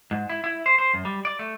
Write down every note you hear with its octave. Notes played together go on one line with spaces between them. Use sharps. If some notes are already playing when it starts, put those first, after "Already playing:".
G#2
E4
E4
C5
C5
F#2
G3
D5
A3